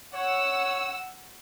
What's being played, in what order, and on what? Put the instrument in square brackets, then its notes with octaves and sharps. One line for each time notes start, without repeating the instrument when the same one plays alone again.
[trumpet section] C#5 [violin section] F#5 E6